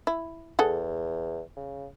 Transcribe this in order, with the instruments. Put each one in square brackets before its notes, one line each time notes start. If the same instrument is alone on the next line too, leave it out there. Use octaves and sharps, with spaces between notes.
[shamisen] E4
[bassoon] E2 [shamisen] G#4 A4 F#5
[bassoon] C#3